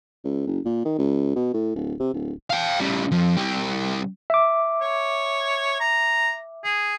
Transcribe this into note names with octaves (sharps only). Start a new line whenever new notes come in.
C#2
F#1
A#2
D#3
C#2
B2
A2
D1
C3
D1
F5 G5
C#3 G3
F2 F3
C2 G4
E5 D6
C#5
A#5
G#4